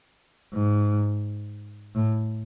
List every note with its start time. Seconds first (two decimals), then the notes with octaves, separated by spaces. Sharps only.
0.53 G#2
1.95 A2